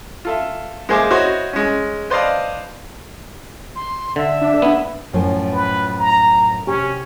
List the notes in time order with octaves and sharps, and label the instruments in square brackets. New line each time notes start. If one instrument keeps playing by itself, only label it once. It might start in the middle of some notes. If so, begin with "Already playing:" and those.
[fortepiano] F4 A4 E5
G#3 A#3 G#4 C5 E5 D6
E4 F#4 C5 C#5 D#5
G#3 C#4
B4 C5 D5 D#5 F5 A5
[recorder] C6
[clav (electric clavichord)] D3 [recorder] E5
[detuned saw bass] D4
[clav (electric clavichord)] B3 E4
[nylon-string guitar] F#2 A2 F3
[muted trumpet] B4
A#5
[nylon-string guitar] C3 G4 [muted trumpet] C#4